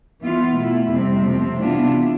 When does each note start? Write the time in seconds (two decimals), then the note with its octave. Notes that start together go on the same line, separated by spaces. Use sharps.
0.22 E3 B3 F4
0.56 B2 A3 E4
0.90 F2 C3 G3 C4
1.25 C3 F3 A3 C4
1.59 C3 E3 B3 D4 F4